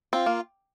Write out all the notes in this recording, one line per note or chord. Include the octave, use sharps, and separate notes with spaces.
C4 F4
A#3